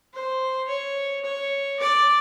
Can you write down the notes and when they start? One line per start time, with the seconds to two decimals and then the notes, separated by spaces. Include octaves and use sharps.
0.13 C5
0.68 C#5
1.25 C#5
1.81 D5